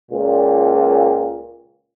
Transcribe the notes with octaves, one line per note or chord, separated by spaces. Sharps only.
C#2 A#2